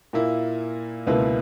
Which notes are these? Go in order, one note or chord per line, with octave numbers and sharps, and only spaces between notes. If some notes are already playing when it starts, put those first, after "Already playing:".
A#2 A#3 E4
C#2 B2 A#3 E4 B4